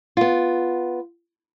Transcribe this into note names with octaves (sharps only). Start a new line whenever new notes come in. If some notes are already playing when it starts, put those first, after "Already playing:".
B3 F4